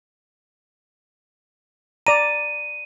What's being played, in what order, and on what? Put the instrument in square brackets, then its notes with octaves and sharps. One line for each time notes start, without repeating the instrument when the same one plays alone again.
[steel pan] D5 A#5 [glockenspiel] D#7